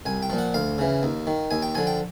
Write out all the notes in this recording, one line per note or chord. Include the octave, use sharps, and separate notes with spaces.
C2 G#5
G5
A#2 F3
F#5
D2 F5
C#3 E3
D#2
D#3
D#2 G#5
G5
D3 F3 G#5
G5